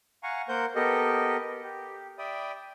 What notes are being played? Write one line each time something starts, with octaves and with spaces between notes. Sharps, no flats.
F5 F#5 G#5 A#5 C#6
A#3 A#4 C5 F#5 G6
B3 G4 A4 A#4 D#5
G4
D5 E5 G5 B5 D#6